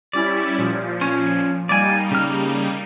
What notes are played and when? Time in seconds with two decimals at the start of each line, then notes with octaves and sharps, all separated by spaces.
0.13 G3 C#4 E4 D5
0.57 A#2 F3
1.01 C#4 C#5
1.69 G3 A#3 D#4 D5 G#5
2.11 C#3 F6